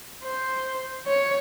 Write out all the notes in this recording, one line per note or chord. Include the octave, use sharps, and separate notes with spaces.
C5
C#5